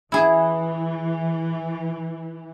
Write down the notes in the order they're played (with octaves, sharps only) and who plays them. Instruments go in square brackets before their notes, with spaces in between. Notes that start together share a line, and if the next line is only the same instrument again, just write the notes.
[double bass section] E3 [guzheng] E4 G#4